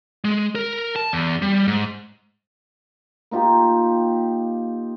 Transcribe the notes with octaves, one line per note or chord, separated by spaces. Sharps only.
G#3
A#4
A5
E2
G3
G#2
A#3 D#4 F4 G4